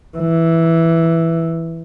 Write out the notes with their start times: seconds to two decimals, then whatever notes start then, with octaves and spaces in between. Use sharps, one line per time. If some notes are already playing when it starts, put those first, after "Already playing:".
0.17 E3